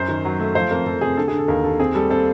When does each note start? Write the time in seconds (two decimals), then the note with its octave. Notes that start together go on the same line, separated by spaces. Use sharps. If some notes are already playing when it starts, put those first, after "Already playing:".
Already playing: F#2 C5
0.09 D#3
0.25 F#3
0.40 A3
0.55 F3 C5
0.71 F2 A#4
0.86 F3 A4
1.01 C3 G#4
1.17 D3 A4
1.28 G#4
1.33 D3
1.38 A4
1.48 D#2 A#4
1.64 D#2 A4
1.80 C4 G#4
1.95 G3 A4
2.10 C4 A4